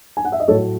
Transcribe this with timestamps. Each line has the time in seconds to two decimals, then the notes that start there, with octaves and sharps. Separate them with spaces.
0.17 G#5
0.25 F#5
0.32 E5
0.40 D#5
0.48 A2 F#3 A3 A4 C#5